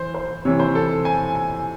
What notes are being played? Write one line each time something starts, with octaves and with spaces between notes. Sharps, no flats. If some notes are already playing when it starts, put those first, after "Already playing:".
Already playing: E3 C5
C5
C3 E3 C#5
C5
A4
G#5
G#5